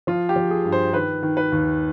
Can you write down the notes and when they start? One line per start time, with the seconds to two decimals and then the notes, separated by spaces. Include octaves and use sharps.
0.07 F3 F4
0.29 G4
0.36 F3
0.51 G#4
0.65 G2
0.72 C5
0.93 D#3 B4
1.23 D#3
1.37 B4
1.52 D#2